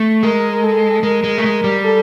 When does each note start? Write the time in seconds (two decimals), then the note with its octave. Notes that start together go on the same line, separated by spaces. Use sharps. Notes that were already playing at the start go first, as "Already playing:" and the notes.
Already playing: A3
0.23 G#3 A#4
0.52 A#4
0.64 A4
1.03 G#3 A#4
1.24 G#3
1.38 A3
1.44 G#3
1.64 G3
1.84 A4